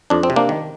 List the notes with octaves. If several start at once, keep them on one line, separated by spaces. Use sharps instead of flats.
F2 D4
C4
C3
A#3 D4
D#3